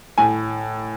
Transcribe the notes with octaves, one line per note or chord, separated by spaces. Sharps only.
A2 G#5